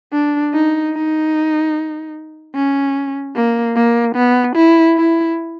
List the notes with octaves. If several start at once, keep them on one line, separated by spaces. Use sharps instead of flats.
D4
D#4
D#4
C#4
A#3
A#3
B3
E4
E4